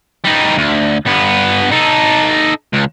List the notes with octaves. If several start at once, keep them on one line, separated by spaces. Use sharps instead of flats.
G3 D#4
D2
G2 B3
D#4 A4
C#2